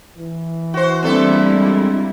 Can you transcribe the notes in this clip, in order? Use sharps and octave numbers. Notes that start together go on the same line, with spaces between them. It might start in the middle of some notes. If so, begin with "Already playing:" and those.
E3
F#4 C5
E2 G3 A#3 C4 D4 E4 A4 E5
G#3